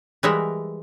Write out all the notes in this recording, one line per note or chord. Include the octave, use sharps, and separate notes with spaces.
E3 G3 G#3 A#4 E5 F#5